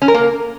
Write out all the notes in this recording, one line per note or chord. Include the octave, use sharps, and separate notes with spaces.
C#4
A#4
A#3